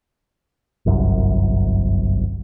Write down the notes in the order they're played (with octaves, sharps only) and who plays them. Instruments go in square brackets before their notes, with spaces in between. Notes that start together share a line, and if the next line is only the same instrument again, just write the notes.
[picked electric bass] G1 C2 F#2